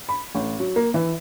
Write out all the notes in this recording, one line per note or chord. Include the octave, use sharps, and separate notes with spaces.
B5
A1
F#3
A#3
E3